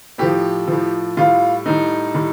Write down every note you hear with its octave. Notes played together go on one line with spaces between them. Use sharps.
A2 F3 G4
A2 F3
A2 G3 F4
A2 G3 D#4
A2 G3